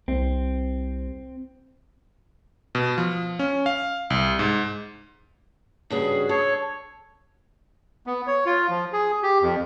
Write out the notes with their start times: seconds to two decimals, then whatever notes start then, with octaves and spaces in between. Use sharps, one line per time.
0.08 C2 C4
2.75 B2
2.98 F3
3.39 C#4
3.66 F5
4.10 C2
4.39 G#2
5.90 G2 C#3 F#4 G#4
6.29 A4 C#5
8.07 B3
8.27 C#5
8.46 F4
8.69 F3
8.93 G#4
9.23 G4
9.42 F2